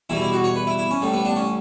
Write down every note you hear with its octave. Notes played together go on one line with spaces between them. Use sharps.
E2 B2 G3 E4
E4
F#4
C#5
B4
E4
E4
C#4
A1 A2 G3
B3
D4
C#4